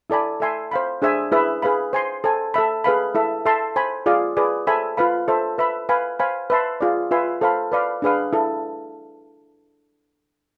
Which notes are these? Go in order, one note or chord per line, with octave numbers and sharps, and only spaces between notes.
E4 A4 D5 G#5 B5
A4 E5 G#5 C6
C5 F5 B5
D4 G#4 C5 E5 G#5
E4 G#4 B4 E5 B5
G#4 B4 F5 B5
C5 G#5 C6
A4 C5 G#5
A4 E5 B5
G#4 B4 F5 B5
E4 A4 E5
A4 E5 A5 C6
C5 G#5 B5
F4 G#4 D5 F5
G#4 B4 D5
A4 C5 E5 G#5 B5
F4 B4 F5 B5
A4 C5 E5
B4 E5 B5
B4 F5 G#5 B5
C5 F5 G#5 B5
B4 E5 A5 C6
F4 G#4 D5
F4 B4 E5 G#5 C6
A4 C5 F5 B5
B4 D5 F5 B5
D4 G#4 B4 F5
E4 A4